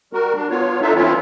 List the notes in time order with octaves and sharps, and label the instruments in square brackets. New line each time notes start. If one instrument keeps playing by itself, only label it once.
[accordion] G3 F#4 A#4
D4
B3 F4 C#5
D4 D#4 F4 A4 E5
E3 C4 C#4 E4 F4